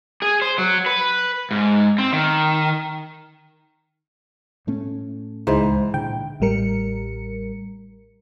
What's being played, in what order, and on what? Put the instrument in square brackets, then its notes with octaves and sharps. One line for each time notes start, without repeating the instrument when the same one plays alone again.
[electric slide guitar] G#4
C5
F#3
B4
G#2
C4
D#3
[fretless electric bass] A2 A3 C#4
[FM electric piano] C#2 G#3 C5 [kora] G#2 E3
[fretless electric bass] A#2 D3 [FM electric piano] G5
[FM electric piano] A1 A2 G3 A#4 C#7